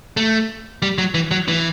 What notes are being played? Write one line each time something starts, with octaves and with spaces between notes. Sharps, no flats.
A3
G3
F#3
E3
F#3
E3